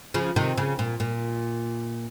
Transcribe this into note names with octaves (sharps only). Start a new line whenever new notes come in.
C#3 F3
C3 D#3
C#3
A#2
A#2